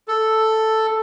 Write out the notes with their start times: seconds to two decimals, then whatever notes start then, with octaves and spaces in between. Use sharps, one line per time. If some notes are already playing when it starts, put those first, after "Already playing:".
0.08 A4